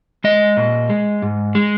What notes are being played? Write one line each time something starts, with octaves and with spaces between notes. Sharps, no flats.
G#3 D#5
A#2
G#3
G#2
G#3